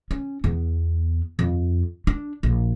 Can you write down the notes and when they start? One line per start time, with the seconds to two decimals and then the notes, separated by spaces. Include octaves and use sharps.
0.11 C#4
0.44 E2 B3
1.39 F2
2.07 D4
2.43 A#1